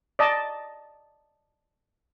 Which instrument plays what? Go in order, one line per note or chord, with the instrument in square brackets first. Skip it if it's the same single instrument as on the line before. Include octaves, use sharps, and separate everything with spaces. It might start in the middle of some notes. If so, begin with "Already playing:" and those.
[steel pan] D5 D#5 A5